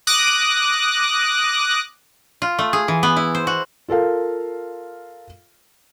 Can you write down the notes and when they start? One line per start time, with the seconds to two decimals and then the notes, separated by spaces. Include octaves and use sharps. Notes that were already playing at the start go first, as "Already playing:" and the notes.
0.07 D6 D#6 F#6 A#6
2.42 F4
2.59 A3
2.73 G#4
2.88 E3
3.03 B3
3.17 E4
3.35 C5
3.47 F#4
3.88 F4 A4 A#4 F5